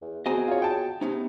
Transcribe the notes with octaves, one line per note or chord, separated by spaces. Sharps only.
E2
C4 F#4 G#4 D#5 G#5 A#5
F4 C#5
G5 A5
C3 B3 C#4 D#4